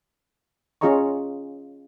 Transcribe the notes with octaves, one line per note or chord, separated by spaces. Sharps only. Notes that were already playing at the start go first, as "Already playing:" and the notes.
C#4 F4 G#4 D#5 A#5 C#6